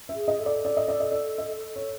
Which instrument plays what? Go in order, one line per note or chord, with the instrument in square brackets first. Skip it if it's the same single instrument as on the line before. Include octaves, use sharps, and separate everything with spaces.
[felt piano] E5
[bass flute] G#4
[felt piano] D#5
[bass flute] A4
[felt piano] D5
D5
D#5
D5
D#5
D5
D#5
C#5